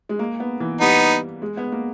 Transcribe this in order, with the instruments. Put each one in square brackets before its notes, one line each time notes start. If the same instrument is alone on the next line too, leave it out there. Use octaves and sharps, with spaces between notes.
[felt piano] G#3
A#3
B3
E3
[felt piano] G3 [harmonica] B3 D#4
[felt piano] G#3
B3
A#3